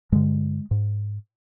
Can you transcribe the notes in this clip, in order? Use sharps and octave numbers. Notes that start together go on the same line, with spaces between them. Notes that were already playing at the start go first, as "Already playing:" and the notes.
G2 D3 G#3
G#2